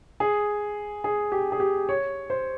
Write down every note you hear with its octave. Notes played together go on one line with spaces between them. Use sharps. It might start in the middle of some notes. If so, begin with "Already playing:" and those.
G#4
G#4
G4
G#4
G4
C#5
C5